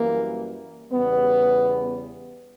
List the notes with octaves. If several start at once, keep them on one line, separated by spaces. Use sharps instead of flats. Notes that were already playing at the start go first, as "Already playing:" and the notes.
Already playing: F#2 E3 G3 A#3
E2 C#3 G3 B3